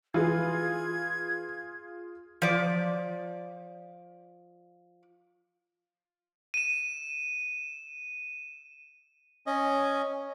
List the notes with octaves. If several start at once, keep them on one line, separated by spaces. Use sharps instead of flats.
E3 F4 G#4 G#6
F3 D5
D#7 E7
C#4 D#5